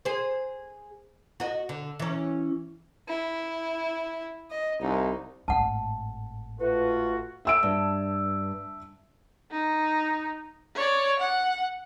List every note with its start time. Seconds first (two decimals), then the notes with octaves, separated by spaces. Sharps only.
0.05 G#4 C5
1.40 F#4 D#5
1.69 D3
1.99 E3 C#4
3.08 E4
4.51 D#5
4.81 C2 D#4
5.48 G#1 A2 F#5 A5
6.59 A3 F4 F#4 B4
7.45 E5 E6 D7
7.63 G2
9.51 D#4
10.75 C#5 D5
11.19 F#5